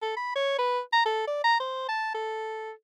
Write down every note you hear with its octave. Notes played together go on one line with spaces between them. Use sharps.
A4
B5
C#5
B4
A#5
A4
D5
A#5
C5
A5
A4